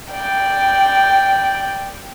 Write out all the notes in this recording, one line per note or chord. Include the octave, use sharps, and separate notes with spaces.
D5 G5